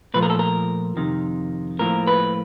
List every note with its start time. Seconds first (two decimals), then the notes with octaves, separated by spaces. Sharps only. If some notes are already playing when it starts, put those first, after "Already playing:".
0.14 A#2 F3 A3 B4
0.23 A#4
0.30 A4
0.39 A#4
0.97 F2 C3 D#3
1.79 A2 F3 A#3 A#4
2.07 B4